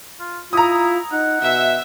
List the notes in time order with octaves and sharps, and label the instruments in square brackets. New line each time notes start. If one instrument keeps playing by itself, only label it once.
[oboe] F4
[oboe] E4 [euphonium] F4 [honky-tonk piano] A#5 D#6
[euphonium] D#4 [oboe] F#5
[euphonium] B2 [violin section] E5